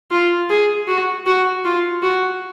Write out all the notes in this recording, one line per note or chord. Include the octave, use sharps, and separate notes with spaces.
F4
G#4
F#4
F#4
F4
F#4